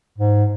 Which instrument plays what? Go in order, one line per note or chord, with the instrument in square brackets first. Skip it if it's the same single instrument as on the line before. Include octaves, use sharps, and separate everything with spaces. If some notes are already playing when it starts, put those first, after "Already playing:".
[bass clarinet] G#2